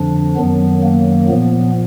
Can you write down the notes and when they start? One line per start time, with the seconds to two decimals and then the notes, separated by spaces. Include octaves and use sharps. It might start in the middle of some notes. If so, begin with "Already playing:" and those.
Already playing: F2 D3 F3 D4
0.36 F#2 D#3 F#3 B3
0.83 A#3
1.28 A#2 F3 B3